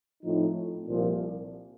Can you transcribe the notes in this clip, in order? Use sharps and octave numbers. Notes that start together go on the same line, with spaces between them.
A2 F3 C4 D#4
C2 A#2 F3